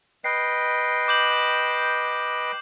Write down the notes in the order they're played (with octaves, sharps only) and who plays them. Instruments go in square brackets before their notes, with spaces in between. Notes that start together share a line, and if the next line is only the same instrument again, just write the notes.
[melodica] B4 D#5 G5 [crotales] C7
[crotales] D6 G6 F#7